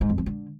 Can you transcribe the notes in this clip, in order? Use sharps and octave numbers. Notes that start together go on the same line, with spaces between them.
G#2
F2
C3
D3